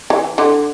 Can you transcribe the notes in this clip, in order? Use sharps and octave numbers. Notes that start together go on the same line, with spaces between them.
E3
D3